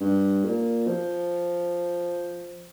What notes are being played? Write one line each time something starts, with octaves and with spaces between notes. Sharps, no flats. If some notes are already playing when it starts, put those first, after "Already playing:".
G2
A#2
F3